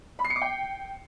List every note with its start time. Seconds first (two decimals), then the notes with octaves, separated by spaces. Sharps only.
0.19 B5
0.25 C7
0.30 C#7
0.36 D6
0.41 G5